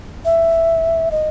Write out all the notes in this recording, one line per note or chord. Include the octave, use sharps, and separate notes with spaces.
E5
D#5